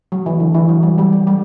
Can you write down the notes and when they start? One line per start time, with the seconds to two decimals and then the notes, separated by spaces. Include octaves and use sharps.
0.12 F#3
0.26 E3
0.40 D3
0.54 E3
0.69 F#3
0.83 G3
0.98 G3
1.13 G3
1.27 G3